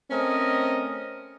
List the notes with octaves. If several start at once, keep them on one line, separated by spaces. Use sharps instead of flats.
A3 C4 C#4 A#4 D#5